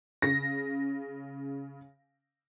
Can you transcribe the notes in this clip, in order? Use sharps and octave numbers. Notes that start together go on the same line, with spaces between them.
C#3 A#6